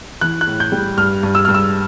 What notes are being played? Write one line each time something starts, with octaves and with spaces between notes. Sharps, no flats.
E3 F#6
F#6
A2
G6
G3
G2 F6
G2
E6
G2 F6
E6